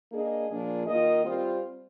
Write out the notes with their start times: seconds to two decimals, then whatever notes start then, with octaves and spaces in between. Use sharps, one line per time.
0.11 A#3 D4 G#4 D#5
0.49 A#2 F3 A#3 D4 G#4
0.86 D#3 A#3 F4 A#4 D#5
1.24 G3 C4 F4 C5